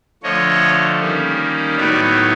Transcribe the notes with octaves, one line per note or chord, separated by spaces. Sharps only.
D3 F3 A3 C#5 D#5
D#3 G3 A#3 C#4
A2 F#3 B3 D#4 D5 E5